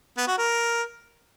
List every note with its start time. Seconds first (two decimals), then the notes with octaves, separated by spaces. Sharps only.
0.17 B3
0.28 F#4
0.38 A#4